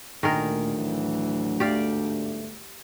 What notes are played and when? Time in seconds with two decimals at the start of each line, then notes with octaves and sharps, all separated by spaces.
0.23 D2 A#2 D#3 A3 G#4 A#4
0.75 A2 E3 F#3
1.60 G1 G#2 A3 G4 D5 F5